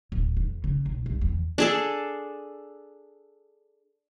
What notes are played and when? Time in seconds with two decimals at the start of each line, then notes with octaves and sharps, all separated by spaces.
0.12 D1
0.37 E2
0.64 C#3
0.86 B1
1.06 C2
1.21 E2
1.58 D4 G#4 A4